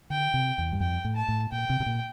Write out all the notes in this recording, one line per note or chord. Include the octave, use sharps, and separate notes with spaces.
D3 G5
C3
E2
G2
F2 G5
A2
A5
A2
A#2 G5
C3
C3
A#2